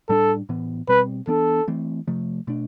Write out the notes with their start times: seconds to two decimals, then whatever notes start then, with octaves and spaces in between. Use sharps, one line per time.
0.09 A2 G3 D4 A4
0.49 A2 E3 B3
0.88 B2 G3 C4 B4
1.27 E3 B3 D4 A4
1.68 E3 A3 C4
2.08 C3 F3 A3
2.47 B2 A3 D4